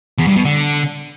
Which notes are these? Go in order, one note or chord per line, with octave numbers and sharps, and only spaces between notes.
E2
G2
B2
D3